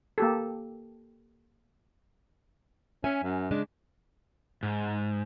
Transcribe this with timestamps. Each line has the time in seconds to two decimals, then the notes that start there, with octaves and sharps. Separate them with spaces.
0.18 A#3 G4 A4
3.04 C#4 E5 G#5
3.24 F#2
3.51 C#3 G#3 D4
4.63 G#2